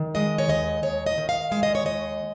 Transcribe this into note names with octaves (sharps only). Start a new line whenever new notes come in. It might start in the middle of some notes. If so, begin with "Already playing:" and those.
Already playing: D#3
G#3 D#5
C#5
D#2 D#5
D#2 C#5
D#5
D#3
F5
G#3 F5
D#5
C#5
D#2 D#5